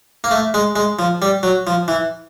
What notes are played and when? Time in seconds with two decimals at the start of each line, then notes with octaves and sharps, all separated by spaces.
0.24 A#3
0.31 A3
0.54 G#3
0.76 G#3
0.99 F3
1.22 G3
1.43 F#3
1.67 F3
1.88 E3